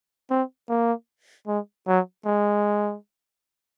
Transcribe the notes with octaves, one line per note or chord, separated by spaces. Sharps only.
C4
A#3
G#3
F#3
G#3